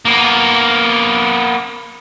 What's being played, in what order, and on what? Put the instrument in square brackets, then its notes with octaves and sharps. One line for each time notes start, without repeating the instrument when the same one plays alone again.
[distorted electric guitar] A#3 B3